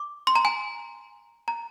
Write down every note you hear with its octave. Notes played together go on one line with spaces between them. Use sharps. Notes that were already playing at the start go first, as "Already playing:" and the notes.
Already playing: D6
C6
A#5
G#5
A#5